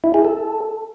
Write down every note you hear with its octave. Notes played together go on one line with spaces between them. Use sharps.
E4
G#4
A4